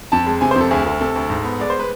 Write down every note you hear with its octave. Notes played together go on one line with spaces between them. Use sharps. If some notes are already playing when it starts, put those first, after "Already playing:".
F2 A5
G#3
C3 G#5
C5
F2
A4
D2 G#4
D2 A4
C3 A4
D2
G#2
B3
G#3 D5
C5
B4